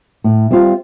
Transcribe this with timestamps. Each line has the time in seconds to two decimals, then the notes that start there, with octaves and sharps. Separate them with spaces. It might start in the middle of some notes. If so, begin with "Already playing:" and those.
0.24 A2
0.51 G3 C4 F4